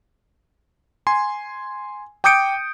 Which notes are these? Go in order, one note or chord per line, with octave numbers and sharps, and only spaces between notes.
G#5 C6
G5 D6 D#6 G6 C#7 D7